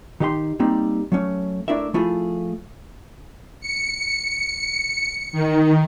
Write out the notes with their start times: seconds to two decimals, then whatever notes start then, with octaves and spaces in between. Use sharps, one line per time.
0.20 D#3 D#4 G4 F#5 C6
0.60 G3 A#3 C4 D#4
1.12 F#3 A3 C#4
1.68 A3 D4 E4 A#4 E5
1.94 F3 A3 E4 F4 G#4
3.61 C#7
5.32 D#3